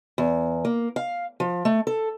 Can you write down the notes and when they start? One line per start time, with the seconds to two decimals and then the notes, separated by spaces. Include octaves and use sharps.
0.18 E2
0.65 A#3
0.96 F5
1.40 F3
1.65 A3
1.87 A4